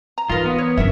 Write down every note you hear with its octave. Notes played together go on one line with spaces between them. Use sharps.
A#5
E3 D#4 F4 A#4 B4
B3
C#5
G1 F#2 C#4 A#4 E5